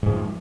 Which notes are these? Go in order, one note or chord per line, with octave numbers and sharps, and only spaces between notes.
G#2 F3 G#3